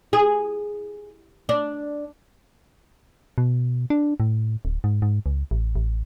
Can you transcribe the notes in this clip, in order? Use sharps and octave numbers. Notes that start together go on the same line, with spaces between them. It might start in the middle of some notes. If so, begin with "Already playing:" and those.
G#4
D4
B2
D4
A2
D1
G#2
G#2
C#2
A1
A1